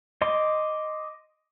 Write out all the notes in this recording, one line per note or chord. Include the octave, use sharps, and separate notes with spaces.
D#5 C6 D6